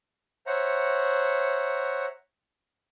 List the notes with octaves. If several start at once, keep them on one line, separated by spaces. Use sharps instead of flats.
C5 C#5 E5 F#5 A#5